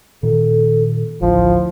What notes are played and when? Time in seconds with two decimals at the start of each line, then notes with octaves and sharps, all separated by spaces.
0.23 A#2 D#3 A4
1.21 A1 D2 F3 E4